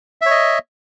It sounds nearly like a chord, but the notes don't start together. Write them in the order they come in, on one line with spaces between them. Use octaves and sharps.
E5 C#5 D#5